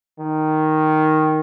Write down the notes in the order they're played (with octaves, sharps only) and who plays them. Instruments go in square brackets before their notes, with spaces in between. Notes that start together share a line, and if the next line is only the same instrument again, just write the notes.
[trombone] D#3